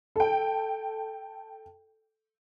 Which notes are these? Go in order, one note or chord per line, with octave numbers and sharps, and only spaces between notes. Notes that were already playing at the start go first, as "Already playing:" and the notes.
A4 G5